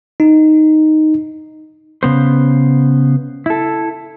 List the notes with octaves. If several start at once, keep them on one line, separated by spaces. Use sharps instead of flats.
D#4
C#3 B3 C5
E4 A4